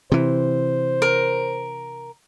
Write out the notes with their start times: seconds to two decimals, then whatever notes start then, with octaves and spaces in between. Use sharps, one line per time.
0.12 C3 E3 C5
1.02 A#4